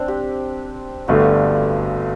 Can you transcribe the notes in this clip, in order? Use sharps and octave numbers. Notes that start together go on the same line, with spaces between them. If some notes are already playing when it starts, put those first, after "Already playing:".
Already playing: C4 D4
G4
G1 G2 D3 A3 F#4